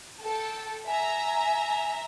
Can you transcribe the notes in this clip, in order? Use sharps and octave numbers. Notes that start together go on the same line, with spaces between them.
A4 G5 A5
E5 G#5 A#5